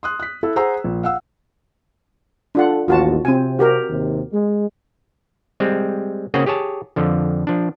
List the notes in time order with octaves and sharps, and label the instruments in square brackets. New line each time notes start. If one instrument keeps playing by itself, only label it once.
[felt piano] C6 D#6 F#6
F#6 B6
E4 A4
G#4 C5 F#5 A#5 E6
A#1
F5 F#5 E6
[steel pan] D4 F4 F#5 [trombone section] A4
[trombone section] A1 D#2 [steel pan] F4 F#4 A5
[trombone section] C3 [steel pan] C4 G#5
[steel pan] F#4 G4 A#4
[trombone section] D#2 C3 D#3
G#3
[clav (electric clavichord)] G3 G#3 C4
C#3 A#3 C4 C#4 F#4 G#4
G4 G#4 C#5 A5
F2 D3 F3
F3 D4